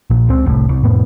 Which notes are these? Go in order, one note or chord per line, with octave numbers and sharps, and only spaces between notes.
A#1 A#2
C#2 C4
F1 C2 A2
C2
C2 F2 A2 B3